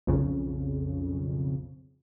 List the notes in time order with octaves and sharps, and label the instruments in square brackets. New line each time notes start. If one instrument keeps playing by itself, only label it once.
[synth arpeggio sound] B1 F2 C#3